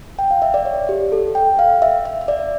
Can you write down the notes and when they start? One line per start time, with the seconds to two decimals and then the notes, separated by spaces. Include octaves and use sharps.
0.19 G5
0.31 F5
0.42 E5
0.54 D5
0.65 C#5
0.89 G4
1.12 A4
1.35 G5
1.59 F5
1.82 E5
2.05 E5
2.21 E5
2.28 D5